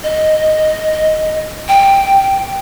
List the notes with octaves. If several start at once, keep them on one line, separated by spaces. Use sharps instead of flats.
D#5
G5